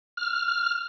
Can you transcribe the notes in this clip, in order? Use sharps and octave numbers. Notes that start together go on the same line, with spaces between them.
F6